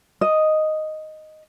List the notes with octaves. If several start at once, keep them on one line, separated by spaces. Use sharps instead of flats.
D#5